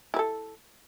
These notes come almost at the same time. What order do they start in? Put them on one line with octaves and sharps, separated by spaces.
E4 B4 A4